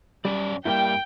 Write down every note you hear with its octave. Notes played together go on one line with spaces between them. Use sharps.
F#2 G3 C#4 D5
G2 G3 A#3 E4 G5